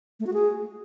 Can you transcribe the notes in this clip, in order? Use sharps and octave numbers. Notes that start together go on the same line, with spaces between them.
A3
F#4
G#4